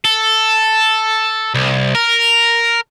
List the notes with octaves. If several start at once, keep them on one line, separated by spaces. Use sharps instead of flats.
A4
C2
A#4